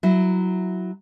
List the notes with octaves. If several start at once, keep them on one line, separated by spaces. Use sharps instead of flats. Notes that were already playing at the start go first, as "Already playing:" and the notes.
F#3 E4